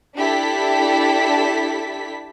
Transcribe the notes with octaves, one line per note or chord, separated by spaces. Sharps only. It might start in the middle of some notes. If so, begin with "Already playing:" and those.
D4 E4 G4 A4 B6